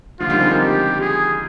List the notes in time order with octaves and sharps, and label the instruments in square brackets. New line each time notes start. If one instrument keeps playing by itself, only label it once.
[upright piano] D3 F3 [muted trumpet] F4
[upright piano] D#3 G3
G#3 C4
G3 A#3
[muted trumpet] G4
G#4